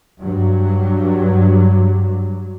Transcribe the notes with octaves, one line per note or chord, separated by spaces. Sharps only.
G2 F#3